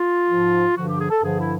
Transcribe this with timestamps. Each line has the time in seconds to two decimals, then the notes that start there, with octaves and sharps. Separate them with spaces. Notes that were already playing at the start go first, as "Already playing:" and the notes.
Already playing: F4
0.29 G#2 F3
0.76 G2 D3 F3 F#4
0.87 G4
0.99 G#4
1.10 A4
1.22 G2 D3 F3 G#4
1.38 E4